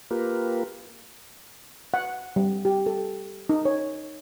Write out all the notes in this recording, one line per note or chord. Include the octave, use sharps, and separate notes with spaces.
A#3 F4 G4 A#4 B4
F#5
G3
G4
A4
D#4
C#5